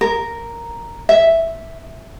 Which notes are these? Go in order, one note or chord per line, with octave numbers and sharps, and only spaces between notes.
A#4
E5